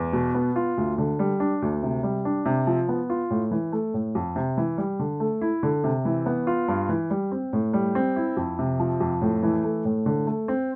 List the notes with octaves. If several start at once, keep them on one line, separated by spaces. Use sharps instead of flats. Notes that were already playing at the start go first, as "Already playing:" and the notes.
Already playing: E2
B2
B3
F4
D2
D3
G3
D4
D2
C3
G3
D4
C3
F3
B3
F4
A2
E3
A3
A2
F2
C3
E3
G3
D3
A3
E4
D3
C3
E3
B3
F4
G2
E3
G3
C4
A2
G3
C4
E4
F2
C3
F3
F2
A2
E3
A3
A2
D3
A3
C4